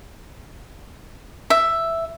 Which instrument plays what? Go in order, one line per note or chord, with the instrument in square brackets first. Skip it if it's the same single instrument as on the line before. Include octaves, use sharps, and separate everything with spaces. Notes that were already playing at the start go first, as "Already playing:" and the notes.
[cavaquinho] E5